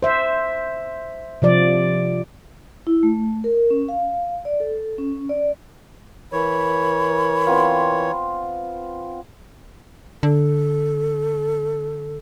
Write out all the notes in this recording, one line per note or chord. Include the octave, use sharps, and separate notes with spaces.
C5 E5
C3 F3 D5
E4
A3
A#4
C#4
F5
D5
A4
C#4
D5
E3 A#4 C#5 B5
B3 C4 F4
D3 A4